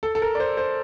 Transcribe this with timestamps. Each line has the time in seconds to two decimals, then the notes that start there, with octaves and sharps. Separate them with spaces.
0.03 A4
0.15 A4
0.22 A#4
0.35 D5
0.40 C5
0.57 C5